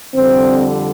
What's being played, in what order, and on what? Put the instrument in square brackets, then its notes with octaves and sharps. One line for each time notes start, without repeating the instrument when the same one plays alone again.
[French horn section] F2 D3 G3 C4